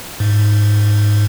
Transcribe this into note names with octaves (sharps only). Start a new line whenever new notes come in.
G#2